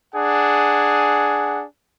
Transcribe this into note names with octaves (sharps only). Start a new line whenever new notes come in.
D4 G#4 F#5 G#5